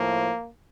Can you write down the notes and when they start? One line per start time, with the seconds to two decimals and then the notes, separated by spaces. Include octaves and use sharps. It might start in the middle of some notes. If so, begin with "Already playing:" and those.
Already playing: A2 F3 A#3